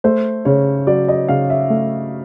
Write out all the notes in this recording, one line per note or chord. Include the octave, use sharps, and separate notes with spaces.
A3 C5
C#3 C#5
F#3 D5
D#5
C#3 F5
E5
A3